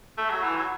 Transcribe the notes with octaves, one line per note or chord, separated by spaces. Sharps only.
A3
F#3
E3
F#3